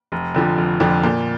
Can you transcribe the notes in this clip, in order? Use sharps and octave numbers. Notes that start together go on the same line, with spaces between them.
F1
F2 D3 F3
F1
F2 D3 F3
A#2